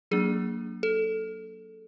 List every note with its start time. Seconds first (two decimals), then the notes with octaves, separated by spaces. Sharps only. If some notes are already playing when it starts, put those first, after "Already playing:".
0.11 F#3 A#3 D4 G#4
0.83 A4